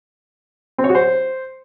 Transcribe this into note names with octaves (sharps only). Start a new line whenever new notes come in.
C4
C#5
F#4
C5